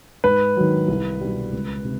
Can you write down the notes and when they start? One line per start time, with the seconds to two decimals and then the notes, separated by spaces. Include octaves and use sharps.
0.24 G#2 B4
0.57 D#3 F#3
0.88 C2
1.21 B2 G3
1.52 C#2
1.84 C3